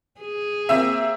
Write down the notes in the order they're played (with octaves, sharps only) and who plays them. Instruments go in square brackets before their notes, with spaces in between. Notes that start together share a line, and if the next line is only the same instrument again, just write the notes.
[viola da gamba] G#4
[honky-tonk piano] A#3 C4 E5